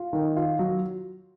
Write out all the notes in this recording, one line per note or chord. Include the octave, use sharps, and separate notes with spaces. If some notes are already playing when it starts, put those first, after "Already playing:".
Already playing: F4
D#3
F4
F#3